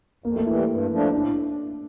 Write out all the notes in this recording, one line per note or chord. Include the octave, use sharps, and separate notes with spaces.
F2 A#3
A3
E3 G3 E4
G2
F3 A3 D4
A2 D4